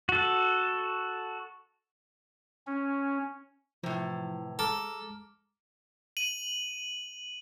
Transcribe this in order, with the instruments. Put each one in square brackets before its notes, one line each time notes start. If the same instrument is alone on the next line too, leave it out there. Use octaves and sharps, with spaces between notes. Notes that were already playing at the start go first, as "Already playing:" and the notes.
[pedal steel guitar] F#4 A4
[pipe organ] C#4
[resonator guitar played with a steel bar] A2 C3 [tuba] E3 [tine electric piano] F3
[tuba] G#3 [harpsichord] A4 [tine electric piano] A#5 D6 F6
[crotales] D#7 F#7